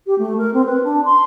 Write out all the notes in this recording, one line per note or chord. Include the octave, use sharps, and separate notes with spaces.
G4
A3
A#4
C4
B4
D4
C6